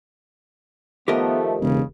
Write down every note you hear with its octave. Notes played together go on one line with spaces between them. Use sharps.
D#3 F3 A3 B3 G4 A#4 D#5
E1 C#3